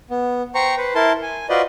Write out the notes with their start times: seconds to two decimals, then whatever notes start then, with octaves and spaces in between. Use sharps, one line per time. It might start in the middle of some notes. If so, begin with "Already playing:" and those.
0.10 B3
0.55 C5 G5 A#5 C#6
0.77 B4 C5
0.95 E4 A#4 A5 C6
1.22 G#5
1.49 F4 F#4 B4 C5 D5 D#5